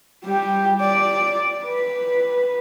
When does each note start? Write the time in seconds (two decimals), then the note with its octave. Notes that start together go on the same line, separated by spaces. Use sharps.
0.24 G3 G4
0.81 D5
1.64 B4